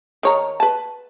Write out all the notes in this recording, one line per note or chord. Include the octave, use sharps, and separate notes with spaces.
D#3 C#5 A#5
B4 A5